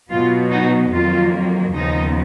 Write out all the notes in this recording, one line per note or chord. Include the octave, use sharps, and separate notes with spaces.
B2 F#3 B3 F4
D#4 F#4
F2 D#3 F#3 A#3 F4
D#2 C#3 F3 B3 D#4